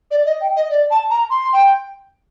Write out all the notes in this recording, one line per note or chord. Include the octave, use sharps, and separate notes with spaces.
D5
D#5
G5
D#5
D5
A5
A#5
C6
G5